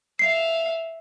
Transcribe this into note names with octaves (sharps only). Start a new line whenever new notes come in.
E5 F5 C7